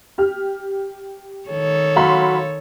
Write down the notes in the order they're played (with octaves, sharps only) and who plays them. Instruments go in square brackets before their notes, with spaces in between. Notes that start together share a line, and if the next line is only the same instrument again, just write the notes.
[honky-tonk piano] G4 F6
[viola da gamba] D#3 A4 C#5
[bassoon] F#3 [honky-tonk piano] F5 B5 C6